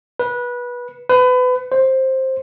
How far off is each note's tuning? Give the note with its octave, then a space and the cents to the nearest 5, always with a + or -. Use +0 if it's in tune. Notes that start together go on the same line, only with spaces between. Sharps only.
B4 -20
B4 +30
C5 +10